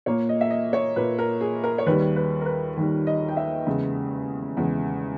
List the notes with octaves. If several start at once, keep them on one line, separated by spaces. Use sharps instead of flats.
A#2 A#3 C#5
D#5
E5
D#5
C#5
A#2 A#3 B4
A#4
G#4
A#4
C#5
D#2 D#3 G3 B4
B4
A#4
B4
D#2 D#3 G3
D#5
G5
E5
E2 C#3 G#3
E2 C#3 G#3